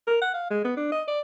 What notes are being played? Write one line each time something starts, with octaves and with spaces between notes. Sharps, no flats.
A#4
F#5
F5
G#3
B3
D4
D#5
D5